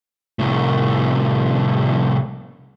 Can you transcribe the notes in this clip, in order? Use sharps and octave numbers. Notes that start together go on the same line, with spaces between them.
C2 A2